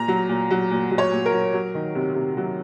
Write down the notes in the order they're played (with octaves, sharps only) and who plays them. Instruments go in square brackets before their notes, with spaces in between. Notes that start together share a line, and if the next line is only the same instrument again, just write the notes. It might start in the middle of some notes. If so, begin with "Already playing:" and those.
Already playing: [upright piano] A#2 A#5
F#3
A#2
F#3
A#2
F#3
C#5
A#2
A#4
F#3
F#3
D#3
C3
C3
F#3